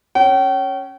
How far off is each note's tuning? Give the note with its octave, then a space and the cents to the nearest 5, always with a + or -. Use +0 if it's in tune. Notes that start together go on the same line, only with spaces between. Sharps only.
C#4 -5 G5 -40